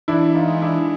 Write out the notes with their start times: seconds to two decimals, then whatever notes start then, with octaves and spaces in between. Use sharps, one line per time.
0.08 E3 D4 E4
0.35 D#4 F4
0.48 G#3
0.61 D4 E4